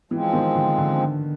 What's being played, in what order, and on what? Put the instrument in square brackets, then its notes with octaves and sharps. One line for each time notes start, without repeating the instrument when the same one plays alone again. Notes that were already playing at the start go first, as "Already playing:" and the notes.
[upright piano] E3 [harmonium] F3 G#3 C4
[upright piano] D#3
D3
D3